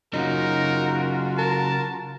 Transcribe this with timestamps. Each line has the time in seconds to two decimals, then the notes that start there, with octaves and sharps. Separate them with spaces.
0.14 C#3 F#3 D#4 F4 F#4 A#4
1.38 A#4 A5